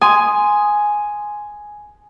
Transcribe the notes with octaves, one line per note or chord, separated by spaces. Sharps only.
G#5 C6 D#6